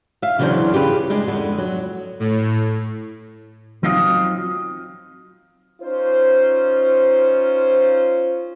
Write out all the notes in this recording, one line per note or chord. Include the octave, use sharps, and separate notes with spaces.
E5 F5
C#3 E3 F#3 C#4 D4 C5
F4 G4 G#4 B4
G3 G#3 D4
F2 D3 B3
F#3
A2
F#3 C4 D#4 F4 D#5
C#4 D#4 F4 C5